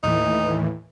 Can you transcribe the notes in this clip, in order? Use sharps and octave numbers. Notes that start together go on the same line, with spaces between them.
D#2 A2 E3 D#4